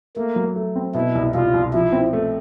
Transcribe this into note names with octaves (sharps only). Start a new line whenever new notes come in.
A3 A#3
F#3
A3
C4
B2 E4
C2
C2 F4
C2
F3 E4
C4
A3